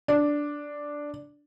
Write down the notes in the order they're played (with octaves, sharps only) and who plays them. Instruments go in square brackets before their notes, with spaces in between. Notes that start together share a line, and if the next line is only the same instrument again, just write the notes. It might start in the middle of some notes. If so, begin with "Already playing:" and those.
[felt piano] D4